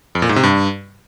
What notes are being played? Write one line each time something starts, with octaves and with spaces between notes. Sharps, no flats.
F2
A#2
G#2
C3
G2